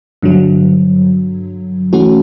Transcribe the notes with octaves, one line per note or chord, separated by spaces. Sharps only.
G2 D3 F#3
E3 A3 C#4 F#4